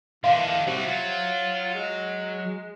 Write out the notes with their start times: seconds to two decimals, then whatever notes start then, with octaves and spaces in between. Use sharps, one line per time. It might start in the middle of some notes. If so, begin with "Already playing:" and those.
0.24 D#3 E3 D4 E5 F5 C6
0.67 G3 C4 F#4 G4 C5 E5
0.86 F#3 F4
1.74 G#3